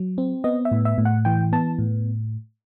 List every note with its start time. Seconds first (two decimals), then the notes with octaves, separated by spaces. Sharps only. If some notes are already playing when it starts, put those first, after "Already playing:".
Already playing: F#3
0.18 C4
0.44 B3 D#5
0.65 E5
0.71 A2
0.85 E5
0.98 A2
1.05 F#5
1.25 E3 G5
1.53 B3 A5
1.79 A2